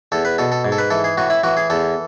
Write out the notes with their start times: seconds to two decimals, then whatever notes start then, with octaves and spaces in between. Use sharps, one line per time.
0.12 E2 A4
0.25 B4
0.38 B2 A4
0.52 A4
0.65 G#2
0.72 A4
0.78 B4
0.90 E3 A4
1.04 G#4
1.17 A2 F#4
1.30 E4
1.44 E3 F#4
1.57 G#4
1.70 E2 A4